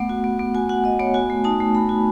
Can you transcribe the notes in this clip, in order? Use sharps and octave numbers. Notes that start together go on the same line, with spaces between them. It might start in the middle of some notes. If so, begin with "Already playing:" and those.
Already playing: A3 B3 F#5
F#4
B3
B3
F#4 G#5
F#4 F#5
F#4 D#5
B3 C#5
F#4 G#5
A3
D#4 A5
A3
D#4 B5
F#4